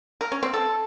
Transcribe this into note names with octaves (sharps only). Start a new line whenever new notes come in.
A#4
C#4
C4
A4